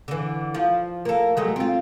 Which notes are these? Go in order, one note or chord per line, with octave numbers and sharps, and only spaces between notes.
D3 E3
F3
A#3 A4
F#3 G#3 A3
C4 F4